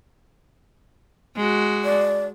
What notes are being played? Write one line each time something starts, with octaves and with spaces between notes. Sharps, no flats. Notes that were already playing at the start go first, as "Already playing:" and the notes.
G#3 F#4
D5